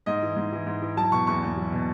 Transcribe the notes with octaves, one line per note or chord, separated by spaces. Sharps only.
G#2 D#5
E3
G#2
E3
G#2
E3
F#3 A5
B2 C#6
E2 C#6
E2
F#3
B2